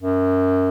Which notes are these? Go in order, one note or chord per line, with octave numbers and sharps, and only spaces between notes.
F#2